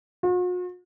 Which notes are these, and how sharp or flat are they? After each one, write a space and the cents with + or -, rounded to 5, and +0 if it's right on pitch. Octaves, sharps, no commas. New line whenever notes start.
F#4 -45